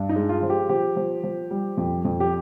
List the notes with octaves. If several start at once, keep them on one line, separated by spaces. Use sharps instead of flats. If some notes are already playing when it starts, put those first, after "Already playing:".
Already playing: G2
D#4
G#3
F4
F3
G4
F3 G4
F3
F3
G3
F2
F2
G4